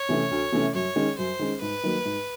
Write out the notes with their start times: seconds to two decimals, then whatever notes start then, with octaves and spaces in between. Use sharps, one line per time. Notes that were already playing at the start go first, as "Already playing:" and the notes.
Already playing: C#5
0.09 C3 E3 A3 C#4
0.31 D2
0.52 C3 E3 A3 C#4
0.75 F#2 C#5
0.96 D#3 G#3 C#4
1.18 F#2 C5
1.39 D#3 G#3 C#4
1.61 G#2 B4
1.84 D#3 F#3 A#3
2.05 G#2